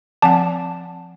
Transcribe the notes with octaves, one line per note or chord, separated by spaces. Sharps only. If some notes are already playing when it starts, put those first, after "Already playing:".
F3 C4 F#5 A5